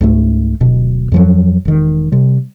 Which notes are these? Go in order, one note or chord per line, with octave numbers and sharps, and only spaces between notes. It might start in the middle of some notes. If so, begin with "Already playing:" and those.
C#2 G#2 A3
D1 B2
F2 F3 F#3
E1 D#3
C3 G3